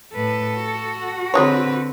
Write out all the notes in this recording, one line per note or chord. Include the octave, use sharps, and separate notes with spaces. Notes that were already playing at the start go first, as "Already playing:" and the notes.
A2 A4 B4
F#4
D3 F#3 G#3 C4 B4 C#5